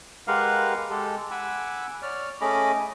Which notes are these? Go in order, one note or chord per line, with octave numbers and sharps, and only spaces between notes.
G#3 G4 A#4 B4 F5 F#5
G#3 G4 A4
F#5 G#5 B5 D6 E6
C#5 D5 F6
A3 C#4 G#4 D#5 B5 D6